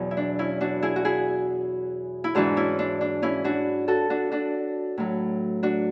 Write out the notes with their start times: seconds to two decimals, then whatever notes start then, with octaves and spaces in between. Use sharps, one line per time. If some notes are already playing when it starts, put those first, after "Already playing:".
Already playing: E2 B2 F#3
0.11 E4
0.17 D4
0.39 C#4 E4
0.61 D4 F#4
0.82 E4 G#4
0.96 F#4
1.05 E4 G#4
2.24 E4
2.35 G#2 E3 D4 F#4
2.57 C#4 E4
2.79 D4
3.01 D4
3.22 C#4 E4
3.44 D4 F#4
3.88 F#4 A4
4.10 D4 F#4
4.31 D4 F#4
4.98 A2 F#3
5.63 D4 F#4